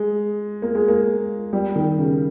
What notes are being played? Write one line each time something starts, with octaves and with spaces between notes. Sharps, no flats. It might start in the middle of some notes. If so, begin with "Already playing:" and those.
Already playing: G#3
A#3
G#3
A#3
G3
D#3
C#3